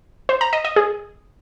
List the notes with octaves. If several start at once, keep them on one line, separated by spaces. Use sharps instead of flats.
C5
A#5
D#5
D#5
G#4